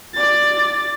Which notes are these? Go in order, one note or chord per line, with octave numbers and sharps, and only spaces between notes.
D5 A6